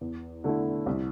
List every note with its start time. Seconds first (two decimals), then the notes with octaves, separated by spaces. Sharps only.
0.01 E2
0.44 D3 A3 E4
0.86 C2